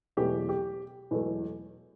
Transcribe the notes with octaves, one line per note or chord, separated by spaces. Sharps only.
E1 E2 B2 F#3 A3 G4
G4
E1 E2 B2 F#3 A3